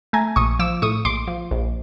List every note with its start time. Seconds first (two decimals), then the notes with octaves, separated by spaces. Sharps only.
0.13 A3 G#5 A#5
0.36 A#1 C#6 D#6
0.59 F3 D6 E6
0.82 A2 C#6 D#6
1.05 A#1 C6 D6
1.28 F3
1.51 A#1